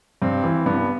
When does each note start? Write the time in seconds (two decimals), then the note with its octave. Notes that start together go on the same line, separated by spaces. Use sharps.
0.22 G2 C4
0.44 E3
0.66 G2 B3